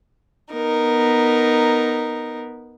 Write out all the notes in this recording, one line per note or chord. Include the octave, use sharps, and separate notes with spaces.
B3 D#4 A#4